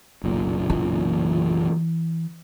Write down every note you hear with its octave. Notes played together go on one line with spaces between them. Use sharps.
F#1 B1 A#2
E3